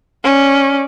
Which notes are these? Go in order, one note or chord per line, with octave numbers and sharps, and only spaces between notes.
C#4 D5